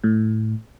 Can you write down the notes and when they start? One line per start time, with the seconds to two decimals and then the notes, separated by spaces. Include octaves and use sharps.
0.04 A2